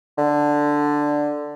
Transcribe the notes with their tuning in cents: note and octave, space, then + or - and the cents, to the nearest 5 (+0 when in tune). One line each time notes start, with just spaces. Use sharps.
D3 +5